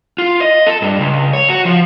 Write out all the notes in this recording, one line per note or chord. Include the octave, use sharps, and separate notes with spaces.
F4
D#5
A4
G2
C#2
C#5
F#4
F3